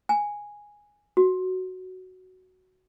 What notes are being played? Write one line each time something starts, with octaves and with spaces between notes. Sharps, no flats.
G#5
F#4